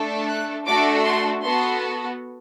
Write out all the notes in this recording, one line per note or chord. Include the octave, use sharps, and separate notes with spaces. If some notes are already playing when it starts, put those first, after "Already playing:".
Already playing: A3 D4 A4
F#6
A3 D4 F#4 A4 D6
C6
B3 F#4 A4 C6